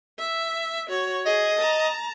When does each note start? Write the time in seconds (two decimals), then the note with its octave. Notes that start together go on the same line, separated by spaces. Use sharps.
0.19 E5
0.89 F#4 C#5
1.26 G#4 D#5
1.58 A5 A#5